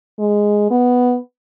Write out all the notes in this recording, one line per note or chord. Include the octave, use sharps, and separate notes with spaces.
G#3
B3